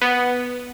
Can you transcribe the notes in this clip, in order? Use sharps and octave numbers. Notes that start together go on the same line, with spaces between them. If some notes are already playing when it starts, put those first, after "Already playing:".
B3